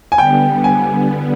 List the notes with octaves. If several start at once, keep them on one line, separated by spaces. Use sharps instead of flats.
G#5
D3 G3 B3 G5
G#5